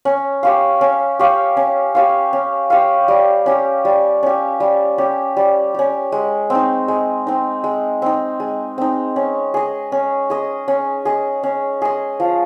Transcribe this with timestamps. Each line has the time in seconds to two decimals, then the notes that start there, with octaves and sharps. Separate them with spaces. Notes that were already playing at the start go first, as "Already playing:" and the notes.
0.05 C#4
0.43 G4 C#5 F5
0.81 C#4
1.19 G4 C#5 F5
1.57 C#4
1.95 G4 C#5 F5
2.33 C#4
2.70 G4 C#5 F5
3.08 G3
3.46 C#4 G4
3.85 G3
4.23 C#4 G4
4.60 G3
4.98 C#4 G4
5.37 G3
5.75 C#4 G4
6.12 G#3
6.50 C4 D#4
6.88 G#3
7.27 C4 D#4
7.64 G#3
8.02 C4 D#4
8.40 G#3
8.78 C4 D#4
9.16 C#4
9.54 G#4 D#5
9.92 C#4
10.30 G#4 D#5
10.68 C#4
11.05 G#4 D#5
11.43 C#4
11.82 G#4 D#5
12.20 F3